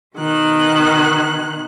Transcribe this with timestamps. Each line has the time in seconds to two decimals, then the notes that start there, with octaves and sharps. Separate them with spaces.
0.17 B2 D#3 F#6